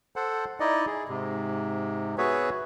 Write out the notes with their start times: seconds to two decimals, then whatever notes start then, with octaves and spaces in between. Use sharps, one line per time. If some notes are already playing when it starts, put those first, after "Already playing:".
0.16 A4 C5 F#5
0.60 D#4 E4 D5 D#5
0.87 G#4
1.09 G#2 C3
2.18 B3 F#4 G#4 B4 C#5 E5